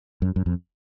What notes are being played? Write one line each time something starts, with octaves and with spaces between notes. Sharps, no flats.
F#2
F#2
F2